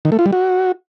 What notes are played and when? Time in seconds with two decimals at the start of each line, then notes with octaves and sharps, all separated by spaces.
0.05 D#3
0.12 A3
0.19 F4
0.26 G3
0.33 F#4